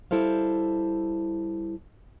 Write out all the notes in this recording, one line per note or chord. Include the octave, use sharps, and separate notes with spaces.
G3 E4 A4 C5 F5